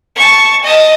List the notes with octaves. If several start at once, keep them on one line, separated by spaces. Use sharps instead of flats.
A5 C#6
D#5 A5